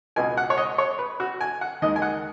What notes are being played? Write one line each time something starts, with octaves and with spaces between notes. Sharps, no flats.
C#2 B2 G#3 G#5
F#5
C#5
D#5
C#5
B4
F#4
G#5
F#5
D#2 D#3 G#3 D#5
G#5
F#5